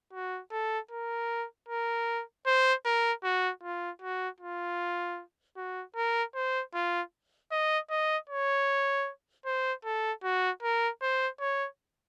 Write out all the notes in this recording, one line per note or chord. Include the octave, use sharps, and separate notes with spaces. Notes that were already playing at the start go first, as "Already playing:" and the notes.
F#4
A4
A#4
A#4
C5
A#4
F#4
F4
F#4
F4
F#4
A#4
C5
F4
D#5
D#5
C#5
C5
A4
F#4
A#4
C5
C#5